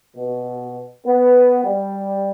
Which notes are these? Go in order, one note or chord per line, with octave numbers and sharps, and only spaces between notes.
B2
B3
G3